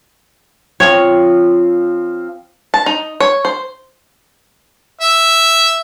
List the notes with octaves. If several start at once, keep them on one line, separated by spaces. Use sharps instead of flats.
F3 C4 F4 C#5
A5
D#4
C#5
C5
E5